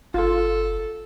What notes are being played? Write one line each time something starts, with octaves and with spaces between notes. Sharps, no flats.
G1 F4 A4